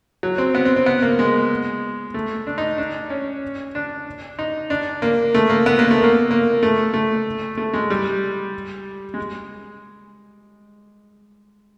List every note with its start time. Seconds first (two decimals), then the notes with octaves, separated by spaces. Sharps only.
0.23 F#3
0.38 C4
0.55 B3
0.65 C4
0.76 C4
0.86 B3
1.02 A#3
1.19 G#3
2.14 A3
2.47 D4
2.58 D#4
2.78 D4
3.10 C#4
3.75 D4
4.39 D#4
4.70 D4
5.02 A#3
5.34 A3
5.50 A#3
5.66 B3
5.79 A#3
5.91 A3
6.04 A#3
6.31 A#3
6.63 A3
6.94 A3
7.57 A3
7.74 G#3
7.90 G3
9.14 G#3